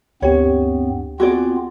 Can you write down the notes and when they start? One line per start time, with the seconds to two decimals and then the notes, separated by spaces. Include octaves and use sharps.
0.22 D2 G2 B3 C4 G4 C#5
1.20 B3 C4 F4 F#4 G#4 D5